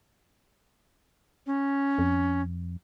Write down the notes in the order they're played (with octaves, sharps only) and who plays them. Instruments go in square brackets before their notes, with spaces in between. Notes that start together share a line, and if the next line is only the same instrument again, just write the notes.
[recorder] C#4
[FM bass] F2